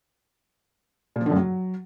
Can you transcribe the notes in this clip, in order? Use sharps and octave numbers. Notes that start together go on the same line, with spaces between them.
A#2
F3
D3
F#2
F#3